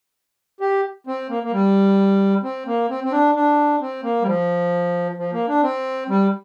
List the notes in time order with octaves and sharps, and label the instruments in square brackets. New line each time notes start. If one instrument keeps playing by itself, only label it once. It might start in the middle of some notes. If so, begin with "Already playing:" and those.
[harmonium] G4
C4
A#3
A#3
G3
C4
A#3
C4
C4
D4
D4
C4
A#3
G3
F3
F3
A#3
D4
C4
G3